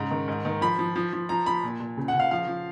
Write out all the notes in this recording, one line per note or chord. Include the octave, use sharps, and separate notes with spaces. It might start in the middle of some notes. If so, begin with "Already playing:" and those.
Already playing: G#2 C#3 A#5
D#3
G#2
D#3
F3 B5
F3
F3
F3
F3 A#5
F3 B5
A#2
A#2
C#3
F#5
C#3
F5
F3 F5
F3